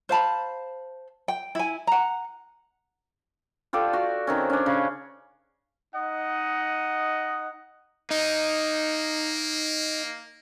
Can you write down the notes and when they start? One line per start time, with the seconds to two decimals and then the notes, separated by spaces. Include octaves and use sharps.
0.09 C5 F5 A5 B5
1.28 G5
1.55 E4 G#5
1.87 F#5 A#5
3.73 F4 G4 A4 D5
3.93 F#4
4.27 D#3 C4 C#4
4.50 C#4 D4
4.66 C#3
5.95 D#4 D#5 F#5
8.11 A#3 D#4